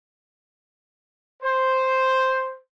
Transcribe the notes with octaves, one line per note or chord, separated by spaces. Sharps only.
C5